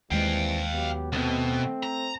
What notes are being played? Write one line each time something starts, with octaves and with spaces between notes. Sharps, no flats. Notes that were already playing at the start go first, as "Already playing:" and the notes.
D#2 E3 G3 G#3 C4 F5 G5
F#3 B3 G4
C2 B2 A3 C4
A#5